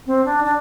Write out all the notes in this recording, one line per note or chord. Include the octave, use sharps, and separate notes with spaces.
C4
D4
D4